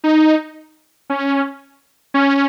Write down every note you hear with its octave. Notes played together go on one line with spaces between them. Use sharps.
D#4
C#4
C#4